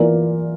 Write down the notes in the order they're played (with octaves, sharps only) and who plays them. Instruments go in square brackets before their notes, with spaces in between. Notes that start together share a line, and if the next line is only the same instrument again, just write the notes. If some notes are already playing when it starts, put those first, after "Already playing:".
Already playing: [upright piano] E3 A#3 F4 A#4 D5